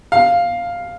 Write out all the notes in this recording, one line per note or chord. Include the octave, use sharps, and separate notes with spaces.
F5